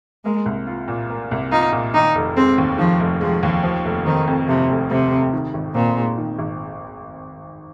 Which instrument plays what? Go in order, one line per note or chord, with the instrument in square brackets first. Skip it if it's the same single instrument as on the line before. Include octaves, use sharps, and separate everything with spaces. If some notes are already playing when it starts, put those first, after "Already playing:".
[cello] G#3 [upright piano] A#3
[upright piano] C2
F4
A#2
A#3
C2
[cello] D#4 [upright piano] F4
[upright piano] A#2
[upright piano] D#3 [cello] D#4
[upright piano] F1
[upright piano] G#3 [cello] C4
[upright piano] D#2
[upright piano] D#3 [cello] F3
[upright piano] F1
[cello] F3 [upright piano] G#3
[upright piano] D#2
F3
F1
[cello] D#3 [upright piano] C4
[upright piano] F2
[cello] C3 [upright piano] F3
[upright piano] F1
[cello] C3 [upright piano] C4
[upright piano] F2
D#3
G#1
[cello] A#2 [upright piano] C4
[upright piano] G#2
D#3
G#1